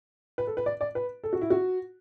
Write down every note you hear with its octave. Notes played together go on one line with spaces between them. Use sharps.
B4
A4
B4
D5
D5
B4
A4
F#4
E4
F#4